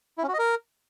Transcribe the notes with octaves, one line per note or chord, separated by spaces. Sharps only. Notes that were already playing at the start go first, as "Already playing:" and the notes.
E4
C#4
F#4
D#5
A#4